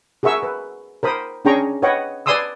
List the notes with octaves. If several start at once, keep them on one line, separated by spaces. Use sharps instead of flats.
F#4 G#4 A#4 E5 C#6 E6
B4
A#4 C5 B5 D#6
C#4 D4 G#4 G5 A#5 C#6
B4 C#5 D#5 F#5 G5
B4 D5 G#5 C6 D#6 E6